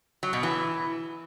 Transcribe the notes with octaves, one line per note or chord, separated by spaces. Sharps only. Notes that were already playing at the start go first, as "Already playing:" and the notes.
F#3
B2
E3